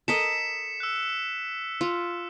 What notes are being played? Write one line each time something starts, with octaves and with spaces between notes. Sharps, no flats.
A4 A#4 D#5 B6 C#7 E7
E6 F#6
F4